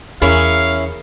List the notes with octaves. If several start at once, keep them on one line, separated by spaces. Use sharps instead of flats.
E2 C#4 E4 G#4 A#4 F5